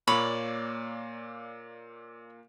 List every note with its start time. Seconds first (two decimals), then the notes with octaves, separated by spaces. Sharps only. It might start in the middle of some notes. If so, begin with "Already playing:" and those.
0.07 A#2 A#3 C#5 D5 B5